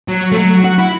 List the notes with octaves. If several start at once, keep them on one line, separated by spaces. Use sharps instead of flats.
F#3
A3
F#3
F#4
E4